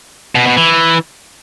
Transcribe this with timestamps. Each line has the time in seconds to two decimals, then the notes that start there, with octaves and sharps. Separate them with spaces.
0.35 B2
0.46 B2
0.57 E3